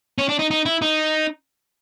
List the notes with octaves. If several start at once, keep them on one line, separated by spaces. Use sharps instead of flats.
C#4
D4
D#4
D#4
E4
D#4